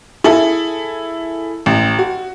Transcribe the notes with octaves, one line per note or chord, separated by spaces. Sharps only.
E4 G#4 A4 E5
A1
F#4